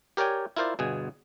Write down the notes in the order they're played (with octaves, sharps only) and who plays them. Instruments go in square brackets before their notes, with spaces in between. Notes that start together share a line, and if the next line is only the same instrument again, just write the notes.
[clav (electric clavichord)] G4 A#4 C#5 D5 G5 G#5
E4 F4 A#4 C5 D5
G1 B2 G#4 G#5